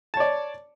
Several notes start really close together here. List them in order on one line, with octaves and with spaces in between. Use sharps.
A5 C#5 D5